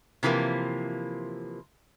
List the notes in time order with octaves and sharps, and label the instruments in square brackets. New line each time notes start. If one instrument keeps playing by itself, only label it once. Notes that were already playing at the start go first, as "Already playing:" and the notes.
[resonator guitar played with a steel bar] C3 E3 F3 A3 A#3